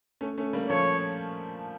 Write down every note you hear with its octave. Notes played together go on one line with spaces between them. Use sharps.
A3 C#4
A3 C#4
G3 A#3
F3 A3 C#5